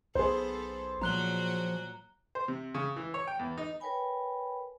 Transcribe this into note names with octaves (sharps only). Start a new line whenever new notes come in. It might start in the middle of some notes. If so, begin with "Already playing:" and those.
B1 B3 G#4 A4 C5
A#2 F3 F#3 F#4 A#5 F#6 G7
C5
C3
C#3
E3
C#5
G5
E2
D#4
A#4 B4 C#5 G5 G#5 B5